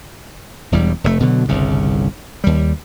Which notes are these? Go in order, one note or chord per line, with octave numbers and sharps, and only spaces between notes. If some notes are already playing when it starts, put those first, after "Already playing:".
E1 E2 G3
F1 G#2 A3
B2 D3 E3 F#3
G1 C2 C#3
D#2 G3